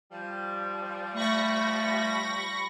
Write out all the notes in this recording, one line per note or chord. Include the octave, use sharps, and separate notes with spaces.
F3 G3
A3 B5 C#6 A#6